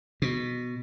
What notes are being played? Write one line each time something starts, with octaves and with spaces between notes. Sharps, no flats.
B2